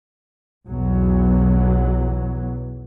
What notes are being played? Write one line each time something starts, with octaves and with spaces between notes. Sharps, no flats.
B1 E2 B2 F#3